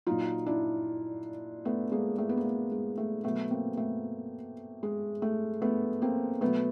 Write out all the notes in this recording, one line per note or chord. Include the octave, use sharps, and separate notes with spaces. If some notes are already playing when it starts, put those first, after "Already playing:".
A#2 F#3 D#4 F4
D4 E4
A3 B3
G#3 A#3
A3
B3
A#3
A3
G#3
A3
B2 F#3 A3 B3
A#3 C4
A3 B3
G#3
A3
A3 B3
A#3 C4
B2 F#3 A3 B3